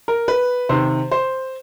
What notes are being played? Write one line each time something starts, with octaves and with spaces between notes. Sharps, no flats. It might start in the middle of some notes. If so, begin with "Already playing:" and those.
A#4
B4
C3 D#3 C5
C5